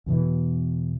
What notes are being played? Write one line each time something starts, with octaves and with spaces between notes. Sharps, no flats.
E2 B2 E3